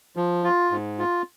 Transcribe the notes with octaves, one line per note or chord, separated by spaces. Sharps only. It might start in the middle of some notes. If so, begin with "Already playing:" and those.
F3
F4
G#2
F4